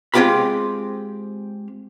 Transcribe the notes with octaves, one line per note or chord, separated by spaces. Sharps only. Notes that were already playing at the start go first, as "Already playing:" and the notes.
G#3 C4 F4 G4 F5 B5